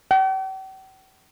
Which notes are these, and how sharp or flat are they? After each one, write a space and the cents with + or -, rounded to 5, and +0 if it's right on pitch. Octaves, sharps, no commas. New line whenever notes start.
G5 -45